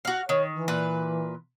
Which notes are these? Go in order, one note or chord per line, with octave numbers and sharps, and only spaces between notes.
F#4 F5
D#3 C#5
E3
A#2 B4